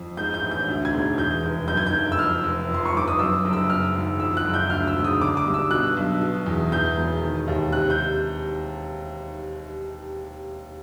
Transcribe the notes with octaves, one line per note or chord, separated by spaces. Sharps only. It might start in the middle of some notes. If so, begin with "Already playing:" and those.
Already playing: F2
G#2 G6
G6
A1
G6
D2
G#6
E1
E2 G6
F1
F#2 G6
G#6
G6
F#1
E6
F2 F6
F1
F2 C6
C#6
G1 D6
D#6
F#2 E6
F#1
E6
F#2 F6
G#1
F2 E6
F#6
F#1
G6
D2 F6
E6
E1
D#6
D3 D6
D6
G2
E6
B2 F#6
B1
B2
E2
E2 G6
E1
D#3
D#2
C3 F#6
G6